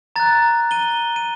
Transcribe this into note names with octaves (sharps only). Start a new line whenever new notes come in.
A#5 F#6 A6
D#7 G7
D#7